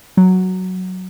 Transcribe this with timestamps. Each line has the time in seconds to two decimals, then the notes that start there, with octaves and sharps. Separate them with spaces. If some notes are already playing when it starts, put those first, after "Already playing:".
0.17 F#3